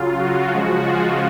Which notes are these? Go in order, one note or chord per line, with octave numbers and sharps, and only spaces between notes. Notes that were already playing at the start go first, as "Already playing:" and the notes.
Already playing: C#3 F#3 F4
F#4
C#3 F3 G#3
F4